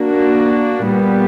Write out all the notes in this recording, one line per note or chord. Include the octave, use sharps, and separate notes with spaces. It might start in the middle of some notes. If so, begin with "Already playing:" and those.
Already playing: A#3 D4 F#4
A#2 G3 B3